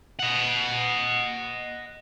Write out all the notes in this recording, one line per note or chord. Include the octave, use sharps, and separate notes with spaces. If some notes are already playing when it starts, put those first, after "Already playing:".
D#5 F#5